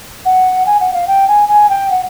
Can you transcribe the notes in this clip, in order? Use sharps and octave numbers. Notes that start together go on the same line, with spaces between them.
F#5
G#5
F#5
F5
G5
G#5
G#5
G5
F#5